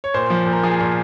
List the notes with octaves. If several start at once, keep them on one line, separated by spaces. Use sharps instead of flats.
C#5
A#2 C5
F3
A#2
A#4
F3 G#4
A#2